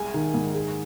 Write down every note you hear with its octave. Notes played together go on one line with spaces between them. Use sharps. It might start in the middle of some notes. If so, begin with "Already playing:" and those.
Already playing: C2 G#3 G#5
D#3
G#2
G#3